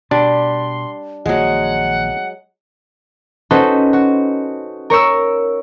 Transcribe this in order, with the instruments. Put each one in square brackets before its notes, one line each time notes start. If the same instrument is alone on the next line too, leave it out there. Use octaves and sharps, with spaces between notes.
[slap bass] B2 [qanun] G3 [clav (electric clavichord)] D4 [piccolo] C6
[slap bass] A#1 D#3 A#3 [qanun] F#3 G#3 [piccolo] F#5
[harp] C#4 D#4 F#4 A4 B4 C5
F#4
A#4 C#5 C#6 E6